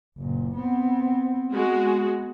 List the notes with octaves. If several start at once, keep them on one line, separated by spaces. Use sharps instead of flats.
F#1 A#2
B3 C4
G#3 B3 F#4